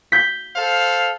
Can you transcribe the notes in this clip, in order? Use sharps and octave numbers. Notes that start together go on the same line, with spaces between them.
G6 B6
A4 C5 F5